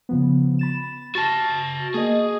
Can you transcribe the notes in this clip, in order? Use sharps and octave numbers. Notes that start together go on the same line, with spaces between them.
C#3 F3 B3
B5 A6 E7
F#4 A5 C#6 A6 A#6
A#3 G#4 D#5